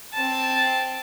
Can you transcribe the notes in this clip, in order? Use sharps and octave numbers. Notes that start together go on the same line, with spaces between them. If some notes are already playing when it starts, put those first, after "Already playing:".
C4 A5